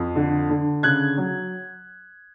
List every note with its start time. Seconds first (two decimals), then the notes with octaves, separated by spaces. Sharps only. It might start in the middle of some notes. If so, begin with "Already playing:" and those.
Already playing: F2
0.16 D3
0.50 D3
0.83 C#3 F#6 G#6
1.17 F#3